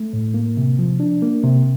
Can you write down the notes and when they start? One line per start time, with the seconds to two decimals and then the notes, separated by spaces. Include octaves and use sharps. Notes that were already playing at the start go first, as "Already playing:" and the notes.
Already playing: A3
0.13 A2
0.34 A#3
0.57 C3
0.79 F3
1.00 D4
1.22 A#3
1.44 C3